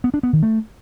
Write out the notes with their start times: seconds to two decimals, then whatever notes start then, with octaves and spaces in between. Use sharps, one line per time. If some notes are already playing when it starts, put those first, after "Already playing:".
0.04 B3
0.14 D4
0.23 B3
0.33 D#3
0.43 A3